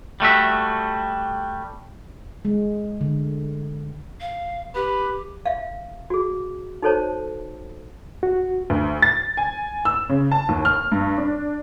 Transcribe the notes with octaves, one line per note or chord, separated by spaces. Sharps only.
G3 A3 F#4 E5
G#3
D3
F5
G4 B4
E5 F5
F#4 G#4
D#4 F#4 A4 C5 C#5 A5
F#4
D2
A6
G#5
E6
C#3
A5
D#2
F6
G2
D4